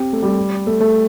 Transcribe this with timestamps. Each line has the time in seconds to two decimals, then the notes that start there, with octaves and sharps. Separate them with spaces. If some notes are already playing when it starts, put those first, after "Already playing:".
Already playing: C4 G4
0.13 A3
0.22 G3
0.67 A3
0.80 A3